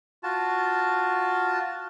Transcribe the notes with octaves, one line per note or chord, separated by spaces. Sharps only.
F4 F#4 A5